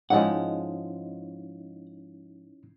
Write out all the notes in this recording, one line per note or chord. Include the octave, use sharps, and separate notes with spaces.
G#2 F3 G#3 C#4 D#4 E4 F#5